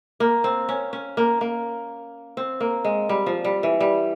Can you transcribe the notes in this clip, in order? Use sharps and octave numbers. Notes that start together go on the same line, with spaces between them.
A#3
C4
C#4
C#4
A#3
A#3
C4
A#3
G#3
G3
F3
G3
E3
G3